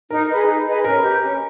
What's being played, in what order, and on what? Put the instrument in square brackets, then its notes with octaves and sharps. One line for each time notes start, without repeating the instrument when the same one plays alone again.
[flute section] D#4 [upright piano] A#4
[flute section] G#4 B4 D#5
D#4
G#4 B4 D#5
[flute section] C#4 [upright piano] A#4
[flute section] G4 B4 D#5
C#4